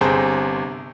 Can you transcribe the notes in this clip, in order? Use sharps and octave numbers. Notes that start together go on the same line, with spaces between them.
G1 C3 G#4 C5 A5 A#5